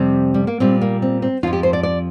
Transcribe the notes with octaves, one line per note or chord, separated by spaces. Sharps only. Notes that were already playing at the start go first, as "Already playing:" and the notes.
Already playing: F2 C3 G3 C4
G3
A#3
A#2 G3 C4
A#3
C4
C4
F2 F3 F4
G4
C5
D5
D5